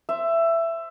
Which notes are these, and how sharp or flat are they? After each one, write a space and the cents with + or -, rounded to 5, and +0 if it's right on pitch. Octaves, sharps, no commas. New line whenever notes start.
C5 +0 E5 +15